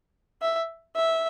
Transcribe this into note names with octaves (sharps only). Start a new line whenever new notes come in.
E5
E5